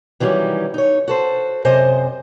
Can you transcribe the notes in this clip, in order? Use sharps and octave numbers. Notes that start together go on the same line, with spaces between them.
D#3 E3 F#3 G3 C#4
D#4 C#5
F#4 A4 C5
F#2 C3 C5 D#5 G#5